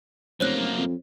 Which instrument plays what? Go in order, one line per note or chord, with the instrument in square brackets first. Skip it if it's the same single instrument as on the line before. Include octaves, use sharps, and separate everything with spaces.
[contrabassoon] F1 [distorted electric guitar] F#2 A#3 [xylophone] C5 C#5 F#6
[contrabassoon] F2